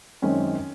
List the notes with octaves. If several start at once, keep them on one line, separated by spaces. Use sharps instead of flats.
F#2 D#3 G#3 C4 C#4